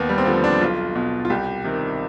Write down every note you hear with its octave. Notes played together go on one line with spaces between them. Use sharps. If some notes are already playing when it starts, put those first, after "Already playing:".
Already playing: D#2 B3
G3
C4
D3 F3 B3
D4
B1 F4
B2
F4
C2 G4
C3 D#3